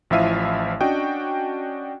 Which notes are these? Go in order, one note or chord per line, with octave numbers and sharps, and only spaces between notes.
A1 F3 E4 E5 F5 D#7
C#4 D4 F#4 D#5 G5